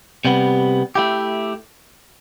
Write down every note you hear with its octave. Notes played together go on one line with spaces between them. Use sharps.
C3 G3 B3
A3 E4 G4